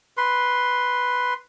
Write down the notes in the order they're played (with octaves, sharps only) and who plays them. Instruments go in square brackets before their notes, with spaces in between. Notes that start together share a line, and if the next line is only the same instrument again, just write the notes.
[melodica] B4 C6